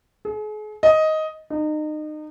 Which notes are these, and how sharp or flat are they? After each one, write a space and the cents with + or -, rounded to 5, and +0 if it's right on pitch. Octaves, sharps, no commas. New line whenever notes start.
G#4 +40
D#5 +10
D#4 -30